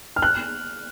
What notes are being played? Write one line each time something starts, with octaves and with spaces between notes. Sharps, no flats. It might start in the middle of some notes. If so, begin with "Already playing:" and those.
F6
F#6